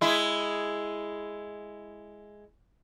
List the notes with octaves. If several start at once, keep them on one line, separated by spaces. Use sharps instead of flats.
G#3 E4